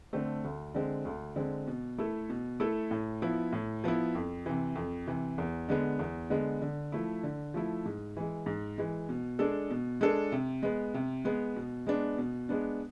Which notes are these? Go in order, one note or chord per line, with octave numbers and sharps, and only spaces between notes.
D3 A3 C4
D2
D3 G#3 C4
D2
D3 G#3 C4
B2
A3 E4 A4
B2
A3 E4 A4
A2
F3 B3 E4
A2
F3 B3 E4
F2
C3 E3
F2
C3 E3
E2
D3 G#3 B3
E2
D3 G#3 B3
D3
F3 A3 E4
D3
F3 A3 E4
G#2
E3 G#3
G#2
E3 G#3
B2
G#3 D4 A4
B2
G#3 D4 A4
C3
G#3 B3
C3
G#3 B3
B2
G#3 B3 D4
B2
G#3 B3 D4